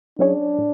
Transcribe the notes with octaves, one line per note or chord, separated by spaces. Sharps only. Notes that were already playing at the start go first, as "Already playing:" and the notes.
F#3 C#4 D4 E4 G#4 C#5
A2